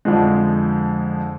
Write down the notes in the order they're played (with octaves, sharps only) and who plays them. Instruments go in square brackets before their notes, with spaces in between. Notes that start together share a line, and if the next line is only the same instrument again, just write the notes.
[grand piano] F2 D3 F3 G#3